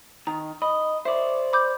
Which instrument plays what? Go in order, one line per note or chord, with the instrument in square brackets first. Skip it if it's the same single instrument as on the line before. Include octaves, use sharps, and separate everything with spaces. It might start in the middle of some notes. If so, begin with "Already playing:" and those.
[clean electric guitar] D#3 [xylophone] A#5
[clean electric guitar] D#5 [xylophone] B5
[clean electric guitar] C5 D5 [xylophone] E5
[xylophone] B5 D6 G6